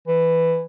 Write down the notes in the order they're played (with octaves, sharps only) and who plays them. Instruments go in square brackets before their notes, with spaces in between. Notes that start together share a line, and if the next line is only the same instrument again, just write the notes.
[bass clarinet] E3